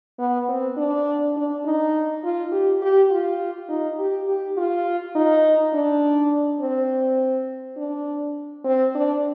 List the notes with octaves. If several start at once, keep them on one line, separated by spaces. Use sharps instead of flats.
B3
C4
D4
D4
D#4
F4
G4
G4
F4
D#4
G4
G4
F4
D#4
D4
C4
D4
C4
D4